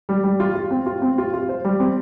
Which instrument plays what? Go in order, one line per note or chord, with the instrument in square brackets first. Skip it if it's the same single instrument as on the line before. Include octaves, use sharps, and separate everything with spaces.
[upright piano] G3
G3
F4
F4
C4
F4
C4
F4
F4
C5
G3
C4